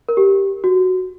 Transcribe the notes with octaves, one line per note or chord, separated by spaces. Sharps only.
A#4
G4
F#4